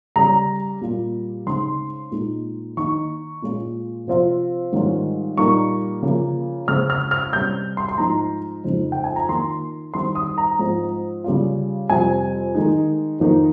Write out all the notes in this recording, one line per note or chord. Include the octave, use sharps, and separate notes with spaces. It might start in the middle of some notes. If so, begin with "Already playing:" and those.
C#3 G3 C#4 A#5
A#2 G3 A#3 F4
C#3 G#3 C4 D#4 C6
A#2 G#3 D#4
D#3 A#3 D#4 C#6
A#2 G#3 C#4 F4
C3 F3 C4 F4
G#2 D#3 G3 C#4 F4
A#2 G3 A#3 D#4 C#6
C#3 F3 A#3
C#3 G#3 C4 F6
F6
F6
C3 G3 C#4 G6
C6
C6
G#2 F3 G#3 D#4 A#5
F2 C#3 G#3 D#4
G5
G#5
A#5
D#3 A#3 F4 C6
D#3 G3 C4 C6
D#6
A#5
G#2 F3 C4
C#3 G3 C#4 F4
F2 C3 G3 C4 G#5
D#3 G#3 D#4
F2 D#3 A#3 D#4